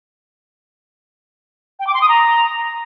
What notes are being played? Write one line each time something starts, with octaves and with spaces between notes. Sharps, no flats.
G5
D6
C6
D#6
A#5